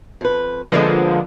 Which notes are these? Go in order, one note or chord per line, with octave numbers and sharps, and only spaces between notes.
F2 B4
D3 F3 G#3 A#3 B3